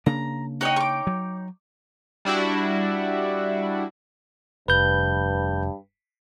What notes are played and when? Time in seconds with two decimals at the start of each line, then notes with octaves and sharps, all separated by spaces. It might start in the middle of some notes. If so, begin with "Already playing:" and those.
0.06 C#3 A#3 D4 A#5
0.61 D#4 F#4 C#5 D#5 G5
0.76 C#6 D6
1.07 F#3
2.25 G3 D4 E4 F#4
4.68 F1 G2 B4 G6